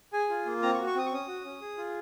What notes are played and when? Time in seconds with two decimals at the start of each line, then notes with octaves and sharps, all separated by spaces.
0.13 G#4 G#5
0.30 F4
0.46 A#3
0.62 C4 A#5
0.74 C#6
0.79 F#4
0.87 C#6
0.95 C4 D#6
1.06 C#6
1.12 C#4 D#6
1.28 F#4
1.44 C#4
1.61 G#4
1.78 F4